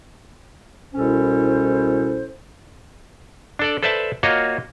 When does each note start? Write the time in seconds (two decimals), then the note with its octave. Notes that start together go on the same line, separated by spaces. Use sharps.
0.94 C2 B2 C#4 E4 A4 C5
3.59 D4 A4 D5
3.83 A4 B4 C5 D5 E5 A5
4.23 A#3 F4 F#4 C#5 D#5